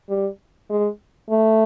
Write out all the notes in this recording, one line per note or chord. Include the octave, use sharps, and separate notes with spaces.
G3
G#3
A3